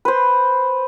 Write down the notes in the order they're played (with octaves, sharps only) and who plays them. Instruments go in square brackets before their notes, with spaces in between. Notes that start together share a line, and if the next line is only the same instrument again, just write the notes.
[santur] B4 C5